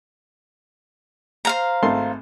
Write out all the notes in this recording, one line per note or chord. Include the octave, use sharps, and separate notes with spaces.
C5 F5 A#5
G#1 A3 C6